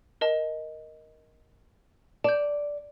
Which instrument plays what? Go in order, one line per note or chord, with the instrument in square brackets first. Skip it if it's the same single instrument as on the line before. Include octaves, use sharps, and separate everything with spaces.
[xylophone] A#4 D#5 A5
[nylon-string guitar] D5 [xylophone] A5 G6